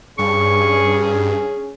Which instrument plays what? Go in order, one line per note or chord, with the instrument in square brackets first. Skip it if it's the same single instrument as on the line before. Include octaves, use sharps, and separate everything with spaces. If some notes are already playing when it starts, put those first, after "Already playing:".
[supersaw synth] G2 [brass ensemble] C#4 G#4 [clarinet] C#6